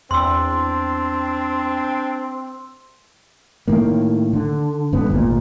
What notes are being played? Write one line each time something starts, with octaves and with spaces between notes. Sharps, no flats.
E2 C4 D4 C6 E6
A2 D#3 A#3
D3
G2 D3 B3
G#1 D2 A#2